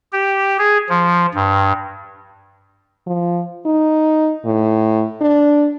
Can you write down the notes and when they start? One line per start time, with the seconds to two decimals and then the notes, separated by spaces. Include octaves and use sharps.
0.12 G4
0.58 G#4
0.89 F3
1.35 G2
3.07 F3
3.66 D#4
4.45 A2
5.21 D4